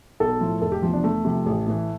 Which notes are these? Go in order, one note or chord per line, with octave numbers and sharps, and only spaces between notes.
B1 A4
A2 F3
F1 A4
G4
E2 C3 F3
D4
E2 A3
C3 F3
A1
A2 E3